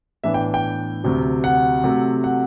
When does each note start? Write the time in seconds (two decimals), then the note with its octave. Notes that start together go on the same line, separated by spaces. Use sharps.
0.24 A2 E3 B3 D4 E5
0.34 G5
0.54 G5
1.04 D2 C3 F#3
1.44 F#5
1.84 C3 F#3 A3
2.24 F#5